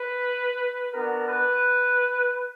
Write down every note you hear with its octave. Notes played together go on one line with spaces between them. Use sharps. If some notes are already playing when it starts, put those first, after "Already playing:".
Already playing: B4
B3 D4 F#4 A#4
B4